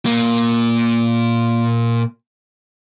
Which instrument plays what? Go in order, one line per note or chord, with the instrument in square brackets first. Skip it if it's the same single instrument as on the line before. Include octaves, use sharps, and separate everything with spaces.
[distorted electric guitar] A#2 A#3